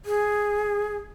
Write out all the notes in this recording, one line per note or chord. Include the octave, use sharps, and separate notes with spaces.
G#4